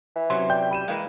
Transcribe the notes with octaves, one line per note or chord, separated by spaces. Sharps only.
E3
C3 F#3 C#4 C6
D5 G5 G6
G3 B5 D#7 E7
E3 G#3 A#3